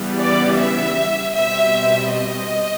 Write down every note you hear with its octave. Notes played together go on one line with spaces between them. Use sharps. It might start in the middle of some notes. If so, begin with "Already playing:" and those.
Already playing: C#3 E3 G3 B3
D5
E5
B2 G3 C4 E5
D#5